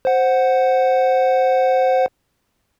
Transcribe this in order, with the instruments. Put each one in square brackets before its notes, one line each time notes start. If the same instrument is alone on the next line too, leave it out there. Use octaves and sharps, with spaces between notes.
[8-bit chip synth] C5 F#5